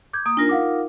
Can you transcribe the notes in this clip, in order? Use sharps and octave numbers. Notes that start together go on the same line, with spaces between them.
D6 G6 G#6
A#3 D#6
D4 D#4 F4 A#4 A#6
F5 F#5 D6